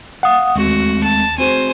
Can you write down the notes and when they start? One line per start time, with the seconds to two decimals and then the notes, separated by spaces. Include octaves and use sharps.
0.23 F5 F#5 D#6
0.56 D#2 G#3 A3 C4 F#4
1.03 A5
1.38 C4 F#4 G#4 C5 G#5